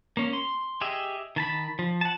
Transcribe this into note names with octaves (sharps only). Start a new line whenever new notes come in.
A#3 C#4
C6
G4 G#4 D#5 E5
D#3 A5 B5
F3
F#5 A5